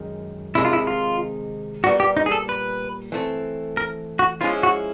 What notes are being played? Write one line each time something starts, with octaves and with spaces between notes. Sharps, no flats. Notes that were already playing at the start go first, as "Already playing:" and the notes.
Already playing: F#2 D#3 G#3
C3 D#3 G#3 E4
F4
E4
F4
A#2 G3 B3 F#4
G4
D#4
G#4
A4
B4
E3 A3 C4
A#4
F#4
F3 G#3 C#4 E4 F4
F#4